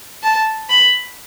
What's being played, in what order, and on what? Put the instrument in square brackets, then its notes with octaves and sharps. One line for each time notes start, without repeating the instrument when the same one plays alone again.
[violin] A5
B5